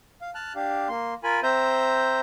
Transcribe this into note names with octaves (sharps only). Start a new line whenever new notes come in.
F5
A5 F6 F#6
D4 G4 F5
A#3 C6
F4 A#4 G#5 B5
C4 C5 E5 A#5 G6